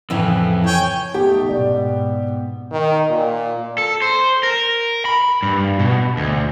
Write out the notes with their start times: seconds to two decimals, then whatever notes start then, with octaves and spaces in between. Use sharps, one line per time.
0.10 F2 A2 C#3 E3
0.66 C#5 G5 G#5
1.14 A3 B3 D#4 G4
1.49 G#2 B2 D5
2.72 D#3
3.10 A#2
3.78 A4
4.02 C5
4.43 A#4
5.05 B5
5.43 G2
5.79 B2
6.17 D2